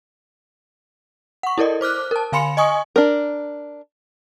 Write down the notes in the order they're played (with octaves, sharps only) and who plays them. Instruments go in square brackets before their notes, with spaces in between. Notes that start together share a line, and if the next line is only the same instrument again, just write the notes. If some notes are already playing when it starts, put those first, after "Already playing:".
[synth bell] F#5 C#6
E4 A4 A#4 D5 D#5
C5 D6 F6 F#6
A#4 A5
D3 F5 G#5 B5 C6 C#7
D#5 G#5 C#6 D#6
[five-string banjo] D4 A#4